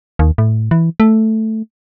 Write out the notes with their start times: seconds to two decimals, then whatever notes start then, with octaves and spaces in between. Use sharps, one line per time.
0.19 D#2
0.38 A2
0.71 E3
1.00 A3